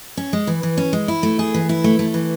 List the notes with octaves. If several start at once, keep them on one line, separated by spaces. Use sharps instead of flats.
C#4
G#3
E3
E3
C#4
G#3
E4
A3
G#4
E3
E4
A3
A3
E3